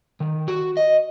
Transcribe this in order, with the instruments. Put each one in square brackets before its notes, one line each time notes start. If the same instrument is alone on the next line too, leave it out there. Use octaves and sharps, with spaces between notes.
[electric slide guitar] D#3
F#4
D#5